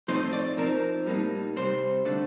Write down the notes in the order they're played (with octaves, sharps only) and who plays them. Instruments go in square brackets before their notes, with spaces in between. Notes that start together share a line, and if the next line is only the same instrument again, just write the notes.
[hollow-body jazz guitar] A2 F3 A3 C4 D#4 C5
D5
F3 C4 D#4 A#4
A2 G3 A#3 D#4
C3 G3 C4 C5
D3 A3 D4